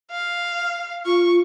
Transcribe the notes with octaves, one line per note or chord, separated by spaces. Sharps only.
F5
F4 C#6